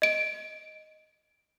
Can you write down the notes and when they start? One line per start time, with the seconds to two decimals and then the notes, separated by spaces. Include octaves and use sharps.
0.02 D#5 D7